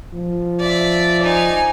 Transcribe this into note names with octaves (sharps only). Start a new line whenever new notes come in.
F3
D5 E5
D#4 G#5